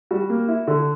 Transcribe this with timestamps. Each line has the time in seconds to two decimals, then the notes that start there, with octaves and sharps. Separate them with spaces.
0.11 G3 F#4
0.30 A#3
0.48 E4
0.67 D3